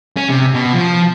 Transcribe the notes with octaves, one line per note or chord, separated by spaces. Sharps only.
C#4
C3
B2
F3